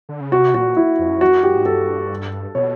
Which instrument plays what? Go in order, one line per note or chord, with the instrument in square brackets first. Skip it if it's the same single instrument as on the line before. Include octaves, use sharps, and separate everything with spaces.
[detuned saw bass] D3
C#3
[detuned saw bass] C3 [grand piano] F#4
[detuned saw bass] A#2 [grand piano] F#4
[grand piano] E4
[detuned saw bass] F2
F#2
F2
[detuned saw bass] F#2 [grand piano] F#4
[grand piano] G4
[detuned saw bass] G#2
[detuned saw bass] G2 [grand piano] A4
[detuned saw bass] B2 [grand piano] C#5